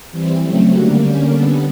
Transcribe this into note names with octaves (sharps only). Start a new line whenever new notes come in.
E3 G3 C4
C#3 F#3 A3 C4
D3 G3 A#3 F#4
D3 G3 A#3 C#4 G4
D3 G3 B3 A4